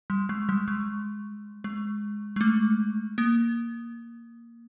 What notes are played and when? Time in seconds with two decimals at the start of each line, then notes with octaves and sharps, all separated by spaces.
0.10 G3
0.29 G#3
0.49 G3
0.68 G#3
1.64 G#3
2.36 G#3
2.41 A3
3.18 A#3